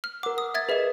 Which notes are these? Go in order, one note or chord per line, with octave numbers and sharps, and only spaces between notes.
F6
A#4 F#5 D6
D#6
E5 G#6 A6
G#4 B4 D#5 E5